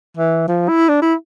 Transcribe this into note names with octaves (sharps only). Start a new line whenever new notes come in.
E3
F3
E4
D4
E4